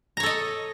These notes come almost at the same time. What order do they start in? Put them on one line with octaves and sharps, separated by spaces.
A#5 C#5 A4 D#5